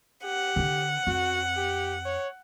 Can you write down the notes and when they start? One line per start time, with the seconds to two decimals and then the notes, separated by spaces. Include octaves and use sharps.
0.24 G4 F#5
0.56 D3 D4
1.07 F2 F#4
1.57 G4
2.05 C#5